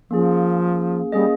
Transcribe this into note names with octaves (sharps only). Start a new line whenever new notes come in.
F3 A#3 C#4 G#4
G3 A#3 C#4 G#4 D#5